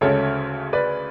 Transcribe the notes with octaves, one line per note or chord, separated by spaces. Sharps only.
D2 C#3 G#3 C#4 A4 C#5
B4 D5